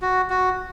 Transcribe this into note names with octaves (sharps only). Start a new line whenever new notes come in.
F#4
F#4